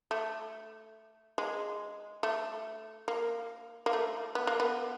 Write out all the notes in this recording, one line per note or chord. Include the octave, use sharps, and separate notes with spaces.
A3
G#3
A3
A#3
A#3
A3
B3
A#3
B3